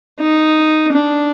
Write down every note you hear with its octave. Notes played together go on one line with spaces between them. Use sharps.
D#4
D4